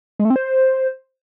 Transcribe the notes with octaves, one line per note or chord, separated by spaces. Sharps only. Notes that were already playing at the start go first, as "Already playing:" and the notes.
G#3
A3
C4
C5